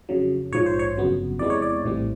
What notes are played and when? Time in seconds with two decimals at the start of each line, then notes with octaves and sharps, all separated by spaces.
0.09 F2 C#3 F#3
0.52 A#1 G#2 F3 C#5
0.66 C5
0.79 C#5
0.96 G1 F2 C#3 F#3 B3
1.39 E2 C3 E3 G#3 B3 D5
1.50 C#5
1.62 D5
1.83 A#1 A2 E3 G3 C4